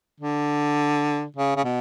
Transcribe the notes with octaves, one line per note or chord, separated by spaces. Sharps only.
D3
C#3
C#3
B2